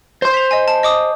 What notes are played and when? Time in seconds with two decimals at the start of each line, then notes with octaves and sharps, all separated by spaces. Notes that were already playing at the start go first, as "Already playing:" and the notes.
0.22 C5 C6
0.34 B6 F7
0.51 D#5 G#5
0.68 A5
0.83 D#5 D6 D#6